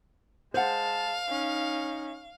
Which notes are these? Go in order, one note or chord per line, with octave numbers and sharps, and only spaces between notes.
G#3 C5 F5 F#5 A5
C#4 D#4